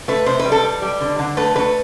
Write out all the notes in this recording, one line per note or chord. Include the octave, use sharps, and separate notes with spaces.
A3 B4
C3 C5
B4
G3
A4
G3
G3
D3
D3
A3 B4
A3 B4